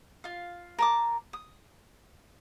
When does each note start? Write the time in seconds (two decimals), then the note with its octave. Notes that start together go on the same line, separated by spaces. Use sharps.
0.24 F4 F5
0.78 A#4 A5 D6
1.33 D#6